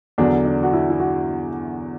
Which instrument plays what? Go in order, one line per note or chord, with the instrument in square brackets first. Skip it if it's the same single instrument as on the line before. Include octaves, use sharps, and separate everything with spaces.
[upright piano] E2 D3 F#3 D4
D4
F#4
E4
E4
F#4